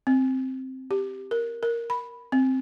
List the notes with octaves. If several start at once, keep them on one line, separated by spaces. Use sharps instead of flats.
C4
G4
A#4
A#4
B5
C4